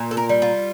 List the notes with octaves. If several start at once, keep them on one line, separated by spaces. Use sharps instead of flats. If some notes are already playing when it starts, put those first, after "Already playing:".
Already playing: A#2
A4
A#4
G3
F4